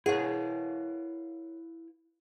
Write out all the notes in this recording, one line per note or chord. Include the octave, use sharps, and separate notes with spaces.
E4 G#4 A#4 B4 C#5 F5 F#5